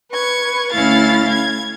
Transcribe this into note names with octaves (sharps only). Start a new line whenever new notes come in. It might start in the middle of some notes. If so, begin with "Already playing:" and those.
B4 C#6 G#6
D2 C#4 E4 F5 A6
G#6